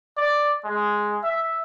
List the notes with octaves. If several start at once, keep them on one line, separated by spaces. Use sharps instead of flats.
D5
G#3
E5